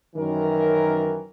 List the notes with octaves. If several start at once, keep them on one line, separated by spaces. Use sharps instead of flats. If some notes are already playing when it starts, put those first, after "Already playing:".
F#2 D#3 E3 A#4